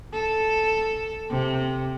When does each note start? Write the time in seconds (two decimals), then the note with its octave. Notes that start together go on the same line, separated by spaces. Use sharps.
0.13 A4
1.30 C3